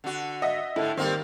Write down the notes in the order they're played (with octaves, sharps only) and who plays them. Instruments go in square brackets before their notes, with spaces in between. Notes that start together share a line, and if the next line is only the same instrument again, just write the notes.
[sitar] D3 F#4
[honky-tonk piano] D#5 E5 F#5
[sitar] A2 D3 [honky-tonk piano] E4 A4
[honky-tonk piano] D#3 [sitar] G3 A#3 C4